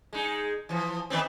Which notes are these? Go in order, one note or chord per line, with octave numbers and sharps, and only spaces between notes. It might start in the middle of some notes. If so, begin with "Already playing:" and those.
G#3 D#4
E3 F3
D#3 B3 C4